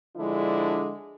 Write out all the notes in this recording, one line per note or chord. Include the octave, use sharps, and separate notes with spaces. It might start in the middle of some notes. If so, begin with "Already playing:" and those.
D3 F3 G#3 D4 E4